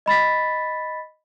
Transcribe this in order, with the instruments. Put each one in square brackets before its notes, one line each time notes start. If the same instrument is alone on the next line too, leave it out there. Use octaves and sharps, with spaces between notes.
[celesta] D#5 B5 A6 B6